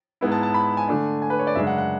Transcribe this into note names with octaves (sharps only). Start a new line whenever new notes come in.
G#2 G#3 B3 E4
A5
A5
B5
G#5
D3 A3 D4
G#5
B4
C#5
D5
F#2 C#3 G#3 D4 E5
F#5
F#5